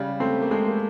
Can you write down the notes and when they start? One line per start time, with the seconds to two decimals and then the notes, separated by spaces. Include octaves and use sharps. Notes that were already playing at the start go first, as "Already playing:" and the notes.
Already playing: C#3 G3
0.20 A3 C4
0.42 A#3
0.51 G#3 A3
0.66 A#3